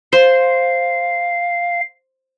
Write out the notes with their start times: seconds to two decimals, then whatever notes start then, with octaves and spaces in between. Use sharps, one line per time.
0.13 C5 F5